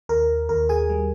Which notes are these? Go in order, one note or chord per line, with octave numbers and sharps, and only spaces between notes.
D#2 A#4
D#2 A#4
G#4 G#5
G3